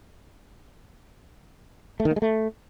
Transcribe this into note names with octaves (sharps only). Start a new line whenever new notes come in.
A3
D#3
A#3
G#3
A3